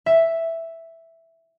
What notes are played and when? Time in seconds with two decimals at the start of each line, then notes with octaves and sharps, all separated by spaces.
0.06 E5